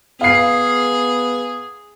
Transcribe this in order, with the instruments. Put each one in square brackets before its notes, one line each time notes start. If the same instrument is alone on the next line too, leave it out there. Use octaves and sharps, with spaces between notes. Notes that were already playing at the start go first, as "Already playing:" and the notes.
[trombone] B3 [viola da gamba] G#4 [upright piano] F5 C7